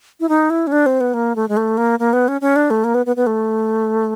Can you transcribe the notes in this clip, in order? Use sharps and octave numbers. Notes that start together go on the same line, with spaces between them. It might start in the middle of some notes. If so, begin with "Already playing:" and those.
E4
D#4
E4
C#4
D4
C4
B3
A#3
A3
G#3
A3
A#3
A#3
B3
C#4
C#4
D4
A3
A#3
B3
B3
B3
A3